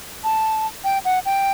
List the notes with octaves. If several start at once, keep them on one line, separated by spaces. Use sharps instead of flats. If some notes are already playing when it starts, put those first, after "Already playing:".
A5
G5
F#5
G5